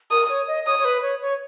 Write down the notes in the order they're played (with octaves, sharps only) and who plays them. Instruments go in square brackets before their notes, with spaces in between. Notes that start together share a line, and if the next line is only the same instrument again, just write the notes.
[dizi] A#4 [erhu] D#6
[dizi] C#5
D#5
[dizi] C#5 [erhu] D#6
[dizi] C#5
B4
C#5
C#5